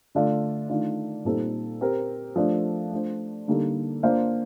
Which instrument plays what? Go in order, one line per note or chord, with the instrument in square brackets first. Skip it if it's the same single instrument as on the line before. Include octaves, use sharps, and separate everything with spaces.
[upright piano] D3 A3 D4 F4
D#3 A3 D4 F4
A#2 G3 C4 D#4 A4
C4 G4 A#4
F3 A3 D4
A3 D4 F4 C5
D3 G3 A#3 D#4 A4
A#3 D4 F4 C5 F5